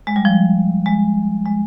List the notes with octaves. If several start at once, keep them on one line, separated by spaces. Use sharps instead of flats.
G#3
G3
F3
G#3
G#3